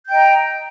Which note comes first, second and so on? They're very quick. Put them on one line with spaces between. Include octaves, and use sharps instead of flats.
G6 G5 D#5 A#5